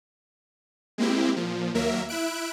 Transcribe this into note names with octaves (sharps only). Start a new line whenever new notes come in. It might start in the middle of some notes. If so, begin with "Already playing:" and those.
G#3 A#3 C4 E4 G4
A#2 F3
D#2 F#3 A#3 A#4 E5
E4 E5 F#6 D7